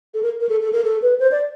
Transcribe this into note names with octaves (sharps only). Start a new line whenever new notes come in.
A4
A#4
A#4
A4
A4
A#4
A4
B4
C5
D5